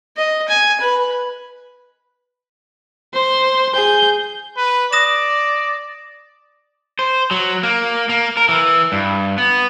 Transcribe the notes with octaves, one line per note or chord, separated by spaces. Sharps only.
D#5
G#5
B4
C5
G#4 G6
B4
D5 D#6 A#6 E7
C5
F#3
A#3
A#3
A#4
E3
G2
B3